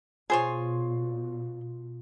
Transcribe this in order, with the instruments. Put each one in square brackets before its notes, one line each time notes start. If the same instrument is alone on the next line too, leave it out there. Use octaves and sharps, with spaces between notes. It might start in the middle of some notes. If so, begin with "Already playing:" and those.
[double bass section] B2 [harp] F4 C6 D#6 [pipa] G#4 C5 C#5